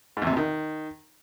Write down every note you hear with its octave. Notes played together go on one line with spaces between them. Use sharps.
G#2
E2
C3
B2
D#3